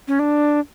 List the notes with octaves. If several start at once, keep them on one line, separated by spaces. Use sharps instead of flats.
C#4
D4